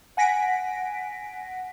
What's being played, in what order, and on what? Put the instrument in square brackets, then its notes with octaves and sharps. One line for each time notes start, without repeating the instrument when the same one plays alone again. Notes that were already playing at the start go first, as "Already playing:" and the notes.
[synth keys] F#5 G#5 A#6 B6 D7